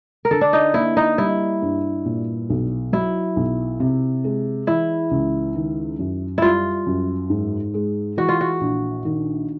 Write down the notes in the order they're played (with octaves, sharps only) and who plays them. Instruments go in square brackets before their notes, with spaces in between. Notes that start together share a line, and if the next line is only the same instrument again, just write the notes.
[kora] A#4
[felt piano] D3 [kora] A4
[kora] D4
D#4
[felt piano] A#3 [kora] E4
[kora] D#4
[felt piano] G3 [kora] E4
[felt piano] G2
A#2
B1
[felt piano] F#3 [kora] E4
[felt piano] B1
C3
G#3
[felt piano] E3 [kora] E4
[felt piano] C#2
D#3
F#2
[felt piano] G3 [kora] E4 F4
[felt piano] F#2
G#2
G#3
[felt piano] E3 [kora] F#4
[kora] F4
F#4
[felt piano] A#1
D#3